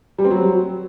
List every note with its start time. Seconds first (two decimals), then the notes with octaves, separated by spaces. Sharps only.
0.18 G3
0.24 C4
0.30 F#3